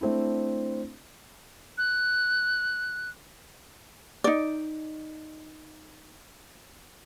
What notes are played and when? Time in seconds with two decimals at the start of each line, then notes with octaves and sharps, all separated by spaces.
0.01 A3 C4 D4 E4
1.78 F#6
4.24 D#4 D5